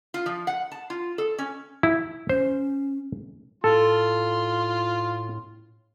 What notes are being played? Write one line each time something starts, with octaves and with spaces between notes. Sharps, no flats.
F4
F3
F#5
A5
F4
A4
C#4
E4
C#4 C5
A2 F4 A4 C6